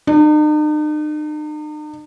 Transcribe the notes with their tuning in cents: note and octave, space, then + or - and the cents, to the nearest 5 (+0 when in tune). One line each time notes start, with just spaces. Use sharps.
D#4 -45